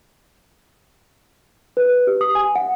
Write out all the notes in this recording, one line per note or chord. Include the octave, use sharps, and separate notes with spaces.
B4
G4
D#6
G#5
F#5